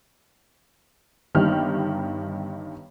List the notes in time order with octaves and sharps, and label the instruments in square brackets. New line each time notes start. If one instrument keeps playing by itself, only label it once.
[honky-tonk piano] G1 G2 D#3 D#4 G4 F6